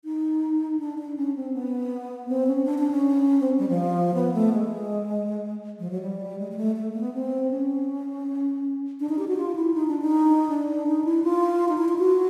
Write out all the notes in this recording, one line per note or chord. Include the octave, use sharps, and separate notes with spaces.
D#4
D4
D4
C#4
C4
B3
C4
C#4
D4
D4
C#4
C4
G3
F3
B3
A3
G#3
F3
F#3
G3
G#3
G#3
A3
A3
A#3
B3
C4
C#4
D4
D#4
G4
F#4
F4
E4
D#4
D4
D#4
D4
D#4
E4
F4
D#4
E4
F4
F#4